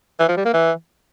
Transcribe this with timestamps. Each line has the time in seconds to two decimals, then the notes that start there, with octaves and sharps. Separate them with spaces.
0.20 E3
0.28 F3
0.37 G3
0.45 A#3
0.54 E3